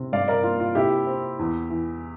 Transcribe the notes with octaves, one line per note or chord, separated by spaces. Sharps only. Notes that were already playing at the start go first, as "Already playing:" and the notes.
Already playing: C3
G2 D5 F5
A#4 D5
A#3 F4
F4
C3 E4 G4
C4
E2
E3